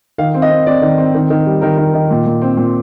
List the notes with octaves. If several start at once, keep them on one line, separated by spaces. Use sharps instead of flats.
D#3 F5
C4
D#5
C4
C4 D5
D#3
C4
D#3
D#3
G3
D#3 A#4
D#3
D#3
A#2
A#2
C4
A#2